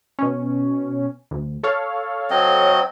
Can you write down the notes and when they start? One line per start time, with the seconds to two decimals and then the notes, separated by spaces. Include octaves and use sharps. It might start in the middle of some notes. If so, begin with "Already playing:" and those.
0.19 B2 C#4
1.31 D2
1.63 A4 C#5 F5
2.31 F#3 C4 D#5